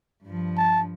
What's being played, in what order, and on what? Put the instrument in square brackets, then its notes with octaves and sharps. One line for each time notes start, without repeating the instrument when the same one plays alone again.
[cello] G2 F3
[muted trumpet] A5